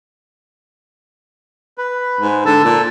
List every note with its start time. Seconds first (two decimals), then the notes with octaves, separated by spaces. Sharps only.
1.78 B4
2.20 G#2
2.46 D3 A5 E6
2.64 A#2